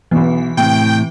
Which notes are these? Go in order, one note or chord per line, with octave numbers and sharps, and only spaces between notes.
B1 B2 E3
A2 C3 G5